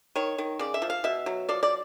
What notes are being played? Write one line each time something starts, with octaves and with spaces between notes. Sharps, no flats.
D#3 C#5
D#3
C#3 D5
E5
F3
F5
B2 E5
F#3
F3 D5
D5